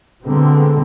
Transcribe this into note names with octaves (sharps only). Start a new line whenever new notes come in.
B2 D3 G#3 A#3 C4